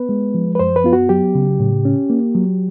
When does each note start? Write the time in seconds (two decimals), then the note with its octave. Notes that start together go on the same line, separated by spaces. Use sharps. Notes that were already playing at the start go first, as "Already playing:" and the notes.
Already playing: B3 B4
0.09 G#3
0.34 F3
0.55 B4
0.59 F#2 C5
0.76 B4
0.84 B3 F4
0.93 F#4
1.09 F#3 G4
1.35 C#3
1.60 A2
1.85 C#4
2.10 A#3
2.35 F#3